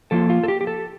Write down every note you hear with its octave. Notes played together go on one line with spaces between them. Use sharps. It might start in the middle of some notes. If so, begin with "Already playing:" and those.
F3 A#3 F4 A4
F4
A4
G4
G4
A4